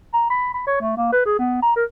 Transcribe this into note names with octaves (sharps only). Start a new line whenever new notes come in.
A#5
B5
B5
C#5
A3
A#3
B4
G#4
B3
A#5
A#4